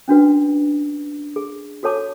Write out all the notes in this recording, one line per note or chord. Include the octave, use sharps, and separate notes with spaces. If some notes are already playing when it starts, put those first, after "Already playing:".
C#4 D4 F#4 B4
G#4
F#4 A4 C#5 A5 D6